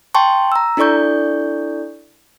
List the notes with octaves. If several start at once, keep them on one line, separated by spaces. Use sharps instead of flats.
G5 A5 C6 C#6
A#5 E6
D4 E4 A4 D5 C#6 G6